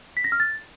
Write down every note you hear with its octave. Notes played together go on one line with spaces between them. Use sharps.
B6
A#6
F6
A6